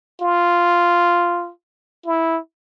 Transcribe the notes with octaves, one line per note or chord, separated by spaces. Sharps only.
F4
E4